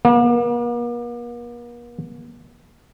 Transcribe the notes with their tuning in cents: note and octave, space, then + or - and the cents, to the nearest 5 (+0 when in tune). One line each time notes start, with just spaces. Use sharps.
A#3 +45